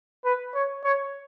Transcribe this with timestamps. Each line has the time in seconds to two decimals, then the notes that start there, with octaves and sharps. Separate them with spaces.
0.25 B4
0.54 C#5
0.84 C#5